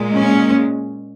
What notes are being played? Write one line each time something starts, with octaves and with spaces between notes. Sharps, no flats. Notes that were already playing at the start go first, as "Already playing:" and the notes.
Already playing: A#2 G#3
C#4